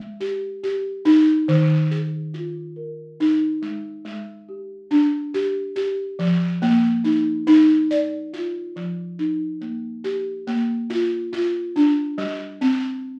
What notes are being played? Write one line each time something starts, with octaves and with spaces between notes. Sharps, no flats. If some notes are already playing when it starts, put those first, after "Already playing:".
Already playing: G#3
G4
G4
D#4
D#3
G#4
F4
A#4
D#4
G#3
G#3
G4
D4
G4
G4
F3
A#3
D#4
D#4
D5
F4
F3
D#4
A#3
G4
A#3
F4
F4
D4
G3
C4